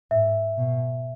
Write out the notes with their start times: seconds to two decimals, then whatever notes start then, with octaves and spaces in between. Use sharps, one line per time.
0.11 G#2 E5
0.58 B2